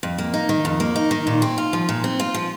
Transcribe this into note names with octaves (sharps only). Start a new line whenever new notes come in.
F2
A#3
D#4
D#3
F2
A#3
D#4
D#3
A#2
C4
F4
F3
A#2
C4
F4
F3